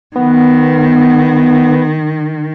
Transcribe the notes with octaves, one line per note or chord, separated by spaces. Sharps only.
D#3 B3